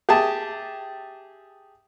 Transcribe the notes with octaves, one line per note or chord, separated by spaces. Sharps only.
G4 G#4 E5 A5